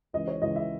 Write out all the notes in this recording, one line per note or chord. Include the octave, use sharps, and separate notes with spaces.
C#2 C#3 E3 D#5
C#5
C#2 C#3 E3 D#5
E5